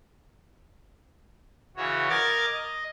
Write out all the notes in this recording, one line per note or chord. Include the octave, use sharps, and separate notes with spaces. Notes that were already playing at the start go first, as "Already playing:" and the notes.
C#3 E3 F#4 C#5
A#4 D#5 D6 F6 G#6 A6
D#5